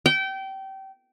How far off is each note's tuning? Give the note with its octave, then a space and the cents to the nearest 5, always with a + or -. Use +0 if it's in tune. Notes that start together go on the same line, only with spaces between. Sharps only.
G5 -25